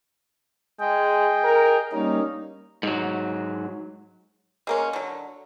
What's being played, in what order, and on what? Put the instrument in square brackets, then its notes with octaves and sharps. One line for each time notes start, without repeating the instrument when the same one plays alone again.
[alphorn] G#3 [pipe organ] G#4 D#5 G5
[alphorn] A#4
[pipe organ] G3 A#3 C#4 [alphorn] D#4
[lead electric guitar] G#2 F#3
[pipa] G#3 A#3 C#4
D3 F#3